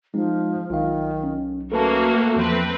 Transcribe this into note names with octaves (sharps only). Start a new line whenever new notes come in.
F3 G#3 C4 D#4
B1 D#3 F4 F5
C#4
A3 A#3 C#4 F#4 A4 B4 A5
E2 F3 C4 B4